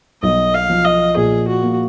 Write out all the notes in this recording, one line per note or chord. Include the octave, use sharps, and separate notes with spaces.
B1 D#5
F5
F3
D#5
A#2 G#4
F#4
A#3